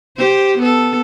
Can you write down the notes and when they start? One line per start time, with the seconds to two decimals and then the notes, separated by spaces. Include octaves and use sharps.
0.17 G4 C5
0.58 B3 A4